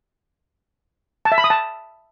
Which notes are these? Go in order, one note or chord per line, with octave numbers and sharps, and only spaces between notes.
A5
E5
B5
D#6
A5